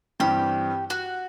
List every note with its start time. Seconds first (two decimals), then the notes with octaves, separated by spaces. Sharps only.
0.20 G2 E3 G3 C4 G4
0.90 F#4